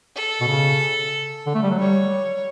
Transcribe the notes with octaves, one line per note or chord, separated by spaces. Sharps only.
A4
B2
C#3
D3
A3
G3
F#3
G3 C#5